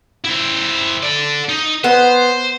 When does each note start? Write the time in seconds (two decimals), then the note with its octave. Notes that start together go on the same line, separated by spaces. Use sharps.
0.24 E4 C5
1.03 A4 D5
1.49 D#4
1.84 B3 C5